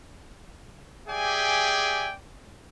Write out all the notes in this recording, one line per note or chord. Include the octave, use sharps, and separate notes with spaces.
G4 G#4 D5 E5 G5 G#5